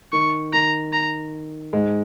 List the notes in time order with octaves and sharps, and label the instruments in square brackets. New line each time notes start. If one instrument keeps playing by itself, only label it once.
[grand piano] D#3 [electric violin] C#6
[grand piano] D#3 [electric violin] A#5
[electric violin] A#5
[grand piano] G#2 G#3